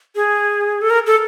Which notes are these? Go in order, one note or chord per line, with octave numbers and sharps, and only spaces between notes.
G#4
A4
A#4
A4